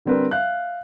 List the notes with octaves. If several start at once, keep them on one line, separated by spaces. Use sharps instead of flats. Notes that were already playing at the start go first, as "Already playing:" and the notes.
D3 G3 C4 A#4 B4
E5 F5 F#6